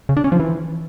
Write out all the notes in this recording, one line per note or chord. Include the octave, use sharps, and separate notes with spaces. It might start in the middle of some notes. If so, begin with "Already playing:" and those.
C#3
D4
C#4
F3
E3